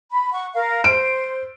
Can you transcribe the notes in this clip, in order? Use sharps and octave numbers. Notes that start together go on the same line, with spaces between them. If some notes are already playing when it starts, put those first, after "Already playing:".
B5
F#5 C#6
A#4 F5
C5 D7